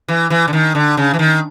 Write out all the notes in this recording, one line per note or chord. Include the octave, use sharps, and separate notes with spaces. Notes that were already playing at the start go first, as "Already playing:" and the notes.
E3
E3
D3
D#3
D3
C#3
E3
D#3